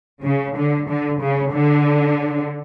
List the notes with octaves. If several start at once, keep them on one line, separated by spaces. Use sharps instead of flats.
C#3
D3
D3
C#3
D3